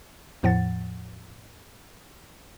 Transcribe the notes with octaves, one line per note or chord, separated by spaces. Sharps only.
E2 A2 F3 F#5 A6